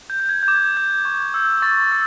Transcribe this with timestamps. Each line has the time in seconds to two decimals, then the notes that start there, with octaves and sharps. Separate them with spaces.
0.10 G6
0.20 G6
0.29 G#6
0.43 G6
0.48 D6 G#6
0.77 G6
1.05 C#6
1.34 E6 G6
1.62 C#6 A6
1.91 E6